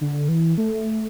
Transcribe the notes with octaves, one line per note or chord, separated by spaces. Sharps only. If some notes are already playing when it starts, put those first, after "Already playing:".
D3
E3
A3